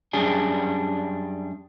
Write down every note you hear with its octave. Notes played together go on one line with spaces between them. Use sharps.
F#2 G3 D4 G#4